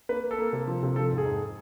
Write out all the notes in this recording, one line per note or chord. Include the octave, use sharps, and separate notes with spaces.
A#3 B4
A#3
A4
A#3
C3
F3
C3
F3 A4
G#2
G#4
G#2